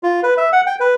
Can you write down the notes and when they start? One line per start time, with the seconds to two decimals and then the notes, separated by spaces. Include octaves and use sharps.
0.03 F4
0.23 B4
0.37 E5
0.52 F#5
0.67 G5
0.80 B4